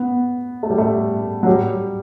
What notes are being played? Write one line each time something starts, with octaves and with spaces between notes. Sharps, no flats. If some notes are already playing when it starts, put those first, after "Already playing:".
Already playing: B3
A3
G3
A3
F#3
G3